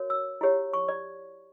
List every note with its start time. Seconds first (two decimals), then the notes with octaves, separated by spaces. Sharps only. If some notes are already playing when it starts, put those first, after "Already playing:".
Already playing: F#4 A#4 C#5
0.10 E6
0.41 E4 G4 C#5
0.73 C#6
0.89 D5